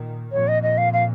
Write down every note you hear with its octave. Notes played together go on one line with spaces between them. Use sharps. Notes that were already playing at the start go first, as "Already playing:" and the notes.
Already playing: A#2 D#3
F2 A#2 C#5
D#5
D#5
F5
F5